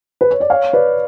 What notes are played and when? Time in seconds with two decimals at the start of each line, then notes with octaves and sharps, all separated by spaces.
0.21 B4
0.31 C#5
0.40 D5
0.50 C#5 F5
0.73 B4 D5